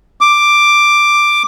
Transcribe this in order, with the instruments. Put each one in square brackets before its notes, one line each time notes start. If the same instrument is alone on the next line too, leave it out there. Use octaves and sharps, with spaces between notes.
[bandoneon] D6